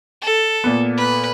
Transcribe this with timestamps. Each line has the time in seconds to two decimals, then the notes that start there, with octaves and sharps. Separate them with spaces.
0.22 A4
0.64 A#2 B3
0.98 B4